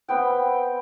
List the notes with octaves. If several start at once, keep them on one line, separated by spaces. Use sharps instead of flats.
B3 C4 G5